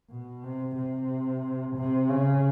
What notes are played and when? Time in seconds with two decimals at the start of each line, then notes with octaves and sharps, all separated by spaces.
0.11 B2
0.44 C3
0.76 C3
1.76 C3
2.09 C#3